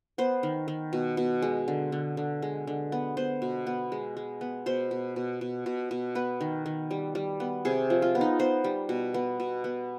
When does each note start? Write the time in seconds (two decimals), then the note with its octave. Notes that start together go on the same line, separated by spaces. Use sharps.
0.18 B3 C5
0.43 D#3
0.68 D#3
0.93 B2
1.17 B2
1.42 G#3
1.68 D3
1.92 D3
2.17 D3
2.42 G#3
2.67 D3
2.92 B3
3.17 B3 C5
3.42 B2
3.67 B3
3.92 G#3
4.17 G#3
4.41 B3
4.66 B2 C5
4.91 B2
5.16 B2
5.41 B2
5.66 B2
5.91 B2
6.15 B3 B4
6.41 D#3
6.66 D#3
6.91 G3
7.15 G3
7.40 B3
7.65 C3 G#4
7.90 F3
8.02 F4
8.15 B3
8.21 D#4
8.39 B3 C5
8.64 G3
8.89 B2
9.14 B3
9.40 B2
9.64 B3